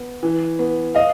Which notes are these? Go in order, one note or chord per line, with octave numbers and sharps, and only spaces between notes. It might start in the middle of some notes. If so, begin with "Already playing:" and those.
Already playing: B3
E3
B3
D#5 F5